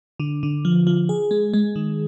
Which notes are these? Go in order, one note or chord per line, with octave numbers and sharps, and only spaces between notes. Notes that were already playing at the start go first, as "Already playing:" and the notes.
D3
D3
F3
F3
G#4
G#3
G#3
D#3